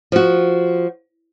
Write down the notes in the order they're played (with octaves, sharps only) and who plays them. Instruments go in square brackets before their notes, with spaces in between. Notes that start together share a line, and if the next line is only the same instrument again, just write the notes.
[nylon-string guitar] F3 F#4